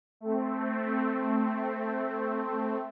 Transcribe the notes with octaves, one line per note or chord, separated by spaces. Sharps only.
A3 C4